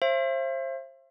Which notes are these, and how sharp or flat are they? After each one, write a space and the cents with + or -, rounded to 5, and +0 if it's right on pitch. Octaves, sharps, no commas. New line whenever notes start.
C5 +30 E5 +40